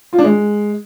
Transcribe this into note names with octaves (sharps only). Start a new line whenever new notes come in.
F4
D4
G#3